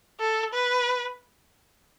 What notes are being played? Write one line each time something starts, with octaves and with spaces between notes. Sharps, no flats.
A4
B4